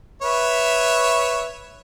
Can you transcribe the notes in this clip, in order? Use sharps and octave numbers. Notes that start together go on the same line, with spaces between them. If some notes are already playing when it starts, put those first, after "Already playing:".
B4 C#5 E5